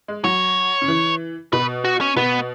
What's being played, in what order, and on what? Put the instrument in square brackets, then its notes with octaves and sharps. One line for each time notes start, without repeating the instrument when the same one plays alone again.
[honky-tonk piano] G#3
[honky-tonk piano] F#3 [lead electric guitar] C#5
[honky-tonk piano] C#3
E3
[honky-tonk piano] B2 [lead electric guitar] B4
[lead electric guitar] F#4
C#4
[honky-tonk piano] B2 [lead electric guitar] B3